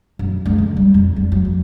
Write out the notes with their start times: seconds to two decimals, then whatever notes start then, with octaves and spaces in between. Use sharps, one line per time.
0.19 F#2
0.46 C#2
0.58 D3
0.77 G3
0.94 F2
1.16 G3
1.32 F#3
1.45 F3